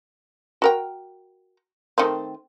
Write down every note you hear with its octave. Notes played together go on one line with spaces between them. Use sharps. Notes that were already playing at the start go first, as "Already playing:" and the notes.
F#4 A#4 G5
D#3 A3 C4